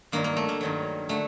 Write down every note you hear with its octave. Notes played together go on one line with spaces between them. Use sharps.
G2 D#3 F#3 A#3
A#3
A3
A#3
G2 D#3 F#3
D3 F#3 A3